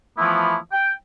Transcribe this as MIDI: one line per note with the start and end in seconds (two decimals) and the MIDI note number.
0.18 0.55 52
0.18 0.55 53
0.18 0.55 57
0.18 0.55 59
0.18 0.55 64
0.72 0.91 79